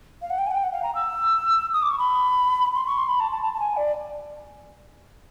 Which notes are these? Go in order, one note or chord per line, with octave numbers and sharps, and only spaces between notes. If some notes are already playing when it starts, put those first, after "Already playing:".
F5
F#5
G5
G#5
F#5
G5
F#5
F5
A#5
E6
D#6
D6
C#6
B5
C6
C#6
C6
B5
A5
A5
A5
A5
G#5
D5